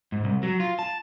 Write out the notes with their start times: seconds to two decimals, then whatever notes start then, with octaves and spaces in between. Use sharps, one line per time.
0.12 G#2
0.24 C2
0.43 F#3
0.60 F4
0.79 A5